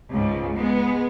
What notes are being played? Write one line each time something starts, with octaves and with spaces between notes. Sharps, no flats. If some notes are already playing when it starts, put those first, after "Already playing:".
C#2 G#2
G#3 B3